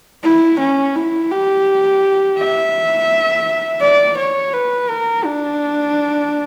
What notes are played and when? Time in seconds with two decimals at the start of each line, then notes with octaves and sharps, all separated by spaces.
0.23 E4
0.59 C#4
0.95 E4
1.31 G4
2.38 E5
3.82 D5
4.17 C#5
4.54 B4
4.89 A#4
5.24 D4